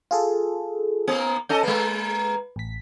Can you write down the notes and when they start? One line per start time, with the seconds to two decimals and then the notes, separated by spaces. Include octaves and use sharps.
0.11 F4 G#4 A4
1.08 A#3 B3
1.49 C#4 A4 D#5 G6
1.63 G#3 A#3 B4
2.56 A1 B6